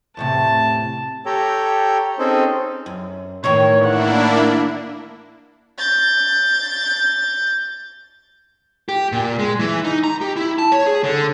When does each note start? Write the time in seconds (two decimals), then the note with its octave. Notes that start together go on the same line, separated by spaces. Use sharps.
0.17 E2 A2 C3 A5
1.26 G4 A4 C#5 G5 A#5
2.19 C4 C#4 D#4 G#4 A4 C5
2.86 F#2
3.44 A2 D#3 E3 C#5
3.85 A#3 D4 E4 F#5
5.78 G6 A6
8.89 G4
9.12 A#2
9.39 G#3
9.60 E3
9.84 D#4
10.04 A#5
10.21 G4
10.36 E4
10.59 A5
10.72 C#5
10.86 G#4
11.04 D3